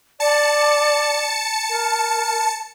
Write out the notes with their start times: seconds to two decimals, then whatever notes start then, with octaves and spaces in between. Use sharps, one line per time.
0.20 D5 A5 C#7
1.69 A#4